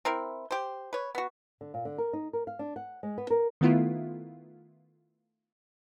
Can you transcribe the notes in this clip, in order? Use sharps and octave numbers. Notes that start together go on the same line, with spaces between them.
C4 E4 A#4
G4 C5
B4 C#5
B3 F#4
D3
A#2
D3
A#4
D#4
A#4
F5
D4
F#5
G#3
B3
A#4
D#3 A3 B3 E4 F4